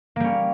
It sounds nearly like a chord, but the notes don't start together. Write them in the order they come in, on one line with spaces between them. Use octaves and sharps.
A#3 G3 C#4